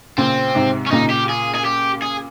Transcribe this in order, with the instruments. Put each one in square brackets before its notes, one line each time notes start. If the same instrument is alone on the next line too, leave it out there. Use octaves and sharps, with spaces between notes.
[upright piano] A#2 C#3 [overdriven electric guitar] C4
[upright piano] G#2 C3
[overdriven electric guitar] C#4
[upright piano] A#2 C#3 [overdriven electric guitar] D#4
[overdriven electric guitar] G4
G#4
G#4
G4
G#4